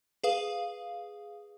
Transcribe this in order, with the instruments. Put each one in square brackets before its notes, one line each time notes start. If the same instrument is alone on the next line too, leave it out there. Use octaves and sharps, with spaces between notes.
[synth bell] G#4 B4 F5 D#6